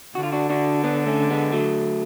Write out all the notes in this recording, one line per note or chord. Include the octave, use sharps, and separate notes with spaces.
D3 F#4
F4
D4 F#4
D4 F#4
B3 D4
A3 C#4
G#3 B3
F#3 A3